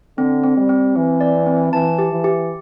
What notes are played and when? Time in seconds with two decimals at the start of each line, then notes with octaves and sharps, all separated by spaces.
0.17 D3 C4
0.43 C4
0.57 G3
0.69 C4
0.96 E3 C4
1.21 D5
1.46 C4
1.72 E3 A5
1.99 G4
2.12 E3
2.24 G4